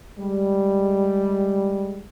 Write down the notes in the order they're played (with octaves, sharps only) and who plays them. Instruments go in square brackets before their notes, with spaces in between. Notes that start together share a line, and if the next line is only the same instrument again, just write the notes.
[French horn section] G3 G#3